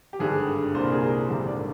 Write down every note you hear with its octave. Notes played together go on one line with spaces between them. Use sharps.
G4
G#1 G2 D3 G#4
C2 A#2 C5
A#4
G#4
A#4
G#1 G2 D3
D5